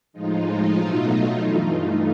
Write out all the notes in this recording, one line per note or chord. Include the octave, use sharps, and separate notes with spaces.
A2 F3 G#3 D#4 F4
B2 F#3 A3
G2 E3 A3 D#4 F4